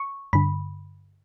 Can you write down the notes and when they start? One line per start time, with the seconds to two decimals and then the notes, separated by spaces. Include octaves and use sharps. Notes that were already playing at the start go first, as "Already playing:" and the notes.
Already playing: C#6
0.33 G2 D3 B5